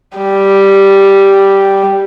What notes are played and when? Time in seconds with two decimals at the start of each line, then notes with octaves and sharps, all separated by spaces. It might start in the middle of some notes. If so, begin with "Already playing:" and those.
0.18 G3